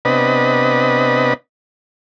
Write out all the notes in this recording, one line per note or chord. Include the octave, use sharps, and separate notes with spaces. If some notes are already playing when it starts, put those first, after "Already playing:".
C3 B3 D4 B4 D#5